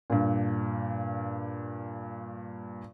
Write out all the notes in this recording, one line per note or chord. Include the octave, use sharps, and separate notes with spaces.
G2 A#2